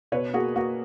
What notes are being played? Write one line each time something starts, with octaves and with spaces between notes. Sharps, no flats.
B2 B4 C#5
A#3 F#4 G#4
A#3 F#4